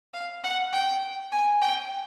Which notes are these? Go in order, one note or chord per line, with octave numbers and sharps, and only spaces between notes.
F5
F#5
G5
G#5
G5